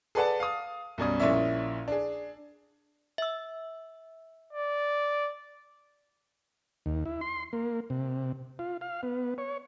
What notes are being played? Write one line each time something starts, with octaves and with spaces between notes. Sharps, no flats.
G#4 A4 B4 D5 F#5 A5
F5 D#6
B1 F#2 G3 D#6
A#1 A#2 C#4 E4 D5 E5
D4 G#4
E5 E6
D5
D#2
E4
C6
A#3
C3
F4
F5
B3
C#5